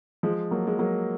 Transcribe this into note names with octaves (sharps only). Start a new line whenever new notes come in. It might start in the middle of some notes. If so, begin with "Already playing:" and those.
F3 G#3
F#3 A#3
G#3
F#3 A#3